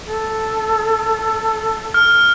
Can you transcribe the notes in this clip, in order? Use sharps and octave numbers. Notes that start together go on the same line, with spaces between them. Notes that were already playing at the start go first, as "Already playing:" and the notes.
A4
F6